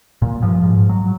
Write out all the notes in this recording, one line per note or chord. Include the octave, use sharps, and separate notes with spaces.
A#2
G2 F3
G#2
F#3